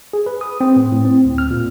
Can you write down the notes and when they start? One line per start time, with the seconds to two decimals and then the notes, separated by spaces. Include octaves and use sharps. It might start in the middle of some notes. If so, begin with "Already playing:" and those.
0.13 G#4
0.26 B4
0.41 D#6
0.61 C4
0.76 A2
0.92 A2
1.05 C4
1.25 D2
1.38 F6
1.51 A#2